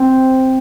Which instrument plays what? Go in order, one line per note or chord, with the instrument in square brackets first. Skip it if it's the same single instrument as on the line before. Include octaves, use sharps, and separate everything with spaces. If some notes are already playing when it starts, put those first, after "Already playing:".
Already playing: [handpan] C4